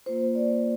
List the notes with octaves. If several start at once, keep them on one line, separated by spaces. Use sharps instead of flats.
A#3 F4 C5
D5